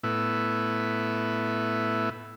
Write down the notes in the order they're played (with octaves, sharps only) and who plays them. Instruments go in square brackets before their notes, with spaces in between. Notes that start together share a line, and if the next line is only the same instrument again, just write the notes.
[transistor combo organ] A2 B3 E4